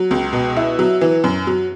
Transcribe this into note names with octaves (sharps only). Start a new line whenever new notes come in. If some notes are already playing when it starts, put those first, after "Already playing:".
Already playing: F#3
C#2
B2
E4
F#3
E3
F#2
F#3